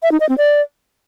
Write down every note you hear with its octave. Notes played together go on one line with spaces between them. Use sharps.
E5
D#4
D#5
C4
D5